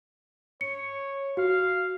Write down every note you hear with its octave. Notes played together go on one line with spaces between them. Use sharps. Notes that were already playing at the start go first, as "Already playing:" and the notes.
C#5 C#7
F#4 F5